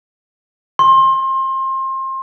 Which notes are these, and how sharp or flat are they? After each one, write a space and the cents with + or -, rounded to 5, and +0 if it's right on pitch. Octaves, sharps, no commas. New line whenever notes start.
C6 +30